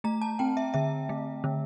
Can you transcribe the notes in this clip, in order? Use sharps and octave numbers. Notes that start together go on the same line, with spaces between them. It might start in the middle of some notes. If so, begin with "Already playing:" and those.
A3 A#5
A5
C4 G5
E5
D3 E5
A3
D3